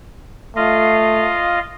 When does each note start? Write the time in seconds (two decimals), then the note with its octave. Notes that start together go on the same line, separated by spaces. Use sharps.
0.56 A3 F4 D#5 F5